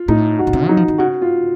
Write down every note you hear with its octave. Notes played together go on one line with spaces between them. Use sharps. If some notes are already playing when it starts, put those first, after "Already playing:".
Already playing: F4
A2 D#4
F#4
A#2
C3
F#3 D#4
F3
D#3
C#3 F#4
F4